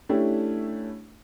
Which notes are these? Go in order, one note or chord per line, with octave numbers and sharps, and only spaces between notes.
A3 C#4 D4 E4 G4